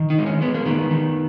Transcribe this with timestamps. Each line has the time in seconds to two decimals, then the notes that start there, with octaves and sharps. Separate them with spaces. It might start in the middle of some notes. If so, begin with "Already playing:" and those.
Already playing: D#3
0.10 D#4
0.18 G#3
0.26 C#4
0.42 G#3 B3
0.55 A#3
0.66 D#3 B3
0.91 D#3